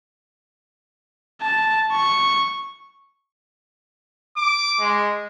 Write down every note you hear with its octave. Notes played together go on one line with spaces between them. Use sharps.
A5
C#6
D6
G#3